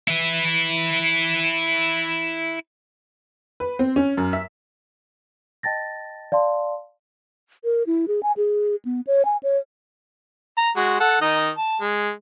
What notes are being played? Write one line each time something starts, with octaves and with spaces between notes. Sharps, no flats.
E4 B4
B4
C4
C#4
F#2
E5
D#5 G5 A5 A6 A#6
D5 F5 A5 C6
A#4
E4
G#4
G#5
G#4
B3
C#5
G#5
C#5
A#5
G#3 F#4
A4 F#5
D#3 D#4 D#5
A5
G#3